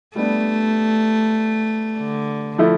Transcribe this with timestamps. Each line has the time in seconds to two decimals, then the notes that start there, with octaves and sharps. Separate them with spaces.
0.15 G3 A3 B3 D4
1.98 D3
2.58 F3 A3 E4